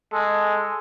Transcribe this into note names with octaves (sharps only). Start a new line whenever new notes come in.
G#3 A4